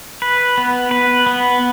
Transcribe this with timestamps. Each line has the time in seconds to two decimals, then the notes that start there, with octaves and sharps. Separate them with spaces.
0.22 B4
0.58 B3
0.91 B4
1.26 B3